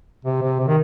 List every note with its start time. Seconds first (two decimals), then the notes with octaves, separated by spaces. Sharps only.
0.25 C3
0.42 C3
0.60 C3
0.68 D#3